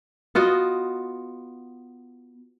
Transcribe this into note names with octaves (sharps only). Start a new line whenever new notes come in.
B3 F4 F#4 D#5